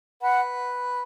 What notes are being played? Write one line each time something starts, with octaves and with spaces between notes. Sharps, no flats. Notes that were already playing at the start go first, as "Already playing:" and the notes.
B4 F#5